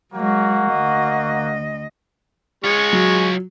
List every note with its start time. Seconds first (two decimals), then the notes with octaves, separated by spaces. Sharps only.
0.13 F#3 G#3 A#3 F#4
0.72 D2 D#5
2.64 G#3 F4 C#5 C#6
2.93 F#3